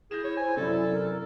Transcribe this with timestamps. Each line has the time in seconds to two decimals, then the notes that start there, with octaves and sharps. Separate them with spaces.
0.11 E4 G#4 G6 A#6 E7
0.24 C#5
0.37 C5 G#5
0.57 F#2 C3 E4 A4 D5
0.92 A#4